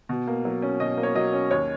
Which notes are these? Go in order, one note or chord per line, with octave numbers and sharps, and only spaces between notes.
B2
A#3
F#3
C#4
B2 D#5
A#3
C#5
F#3 D#5
C#4
D#2 C#5